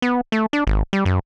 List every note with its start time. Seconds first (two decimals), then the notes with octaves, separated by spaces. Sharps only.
0.02 B3
0.32 A3
0.53 D4
0.67 G#1
0.93 G3
1.05 F#2